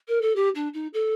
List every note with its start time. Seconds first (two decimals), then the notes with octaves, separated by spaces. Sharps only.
0.08 A#4
0.21 A4
0.36 G4
0.55 D4
0.73 D#4
0.93 A4